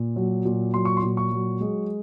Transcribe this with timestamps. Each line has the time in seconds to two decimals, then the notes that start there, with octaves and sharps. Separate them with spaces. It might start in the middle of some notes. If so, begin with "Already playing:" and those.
Already playing: A#2
0.16 F#3
0.45 A#2
0.74 F#3 C6
0.85 C#6
0.97 C6
1.03 A#2
1.17 C#6
1.32 F#3
1.60 G#3